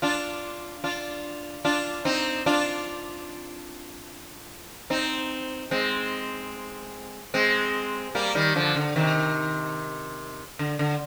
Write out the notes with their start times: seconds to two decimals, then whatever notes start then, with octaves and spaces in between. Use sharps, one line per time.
0.02 D4 F4
0.84 D4 F4
1.65 D4 F4
2.05 C4 D#4
2.46 D4 F4
4.90 C4 D#4
5.71 G#3 C4
7.34 G#3 C4
8.15 G3 A#3
8.35 D#3 G3
8.55 D3 F3
8.76 D3
8.96 C3 D#3
10.59 D3
10.79 D3